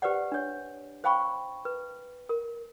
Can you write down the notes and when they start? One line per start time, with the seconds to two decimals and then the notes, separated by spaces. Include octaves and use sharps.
0.02 G4 B4 C5 D5 F#5
0.32 D4 C#5
1.04 C5 F5 G5 B5 C#6
1.65 B4
2.29 A#4